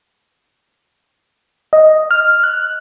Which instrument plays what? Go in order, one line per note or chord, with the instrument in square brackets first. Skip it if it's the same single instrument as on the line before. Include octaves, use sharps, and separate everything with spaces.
[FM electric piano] D#5
F6
F#6